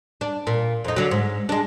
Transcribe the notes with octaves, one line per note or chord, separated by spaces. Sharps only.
D4
A#2
F2 D#4
D3 F#3
G#2
G#3 D4